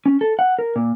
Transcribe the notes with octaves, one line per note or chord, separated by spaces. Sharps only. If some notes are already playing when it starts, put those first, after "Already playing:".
C#4
A4
F#5
A#4
A#2